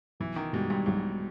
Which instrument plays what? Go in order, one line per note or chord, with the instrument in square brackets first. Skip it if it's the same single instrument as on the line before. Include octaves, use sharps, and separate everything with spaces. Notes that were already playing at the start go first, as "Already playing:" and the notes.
[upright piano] B1 [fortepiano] E3
[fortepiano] D#3
[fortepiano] G#2 [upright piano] B2 G3
[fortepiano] G2
[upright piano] B1 [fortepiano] G#2